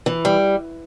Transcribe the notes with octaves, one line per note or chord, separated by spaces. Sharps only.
E3
G3